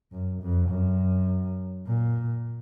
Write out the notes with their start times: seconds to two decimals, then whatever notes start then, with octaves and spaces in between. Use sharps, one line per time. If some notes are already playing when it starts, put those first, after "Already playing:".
0.12 F#2
0.42 F2
0.70 F#2
1.87 A#2